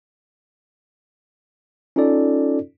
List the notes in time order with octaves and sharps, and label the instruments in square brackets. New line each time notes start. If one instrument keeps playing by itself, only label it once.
[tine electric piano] C#4 D#4 F4 A4 D5